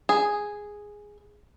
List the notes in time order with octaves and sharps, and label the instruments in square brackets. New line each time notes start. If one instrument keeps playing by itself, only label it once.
[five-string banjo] G#4